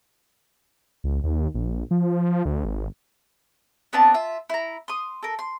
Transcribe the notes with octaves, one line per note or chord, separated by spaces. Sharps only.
C#2
D#2
A#1
F3
D2
G#1
B3 C4 D4 A5
F4 E5
E4 A#5
C6 D#6
A4 A#4
C6